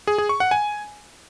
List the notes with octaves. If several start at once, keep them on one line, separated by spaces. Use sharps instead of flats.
G#4
G#4
C#6
F#5
G#5